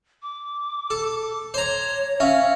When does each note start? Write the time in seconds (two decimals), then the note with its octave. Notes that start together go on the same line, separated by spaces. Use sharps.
0.22 D6
0.90 A4
1.54 C5 C#5 A#5
2.20 C#4 E5 F5